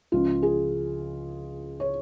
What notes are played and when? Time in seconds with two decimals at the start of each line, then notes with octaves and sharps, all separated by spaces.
0.12 C#2 C#3 F3 F4
0.43 G#4
1.80 C#5